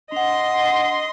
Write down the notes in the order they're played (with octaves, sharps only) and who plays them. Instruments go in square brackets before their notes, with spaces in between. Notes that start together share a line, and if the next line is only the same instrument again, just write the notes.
[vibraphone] D4 F#5 [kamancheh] D#5 C6